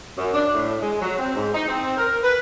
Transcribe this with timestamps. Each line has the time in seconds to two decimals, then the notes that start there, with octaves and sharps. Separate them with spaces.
0.18 F#2
0.33 D4
0.53 A2
0.81 G#3
1.01 F#3
1.17 C4
1.34 G#2
1.53 D#4
1.68 C4
1.97 A#4
2.24 B4